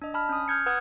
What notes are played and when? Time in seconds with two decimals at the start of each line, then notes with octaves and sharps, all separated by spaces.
0.02 D4 D#5
0.14 A5 B5 F6
0.29 C#4 D#6
0.48 F6 G6 G#6 C#7
0.66 B4 F#5 D#6 F#6 G#6